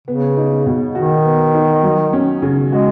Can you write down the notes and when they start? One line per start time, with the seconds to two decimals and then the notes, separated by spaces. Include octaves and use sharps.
0.08 C#3 B3
0.37 D#4
0.66 B2
0.95 D#3 F#4
1.25 B3
1.55 D#4
1.84 F#3
2.13 C#4
2.42 C#3
2.72 G#3 F#4